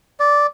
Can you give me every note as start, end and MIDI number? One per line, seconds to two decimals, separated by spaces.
0.20 0.47 74